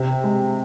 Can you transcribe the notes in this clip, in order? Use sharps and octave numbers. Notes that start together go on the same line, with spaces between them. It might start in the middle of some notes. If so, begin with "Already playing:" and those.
Already playing: C3
G#3